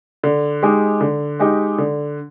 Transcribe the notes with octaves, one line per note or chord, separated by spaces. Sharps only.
D3
G#3 D#4 G4
D3
G#3 D#4 G4
D3